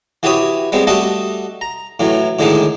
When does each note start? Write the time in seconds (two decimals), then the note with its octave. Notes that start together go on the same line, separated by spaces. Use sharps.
0.23 E3 F#4 G4 C#5 B5 D#6
0.72 G3 G#3 B3 C4
0.87 G3 A3 F#4 A4 D#5 F#5
1.61 A#5
2.00 A2 E3 F#3
2.39 A2 D3 D#3 G#3 D4 D#4